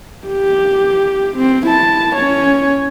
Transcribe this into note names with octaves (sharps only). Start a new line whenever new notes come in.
G4
C4
E4 A5
C#4 C#5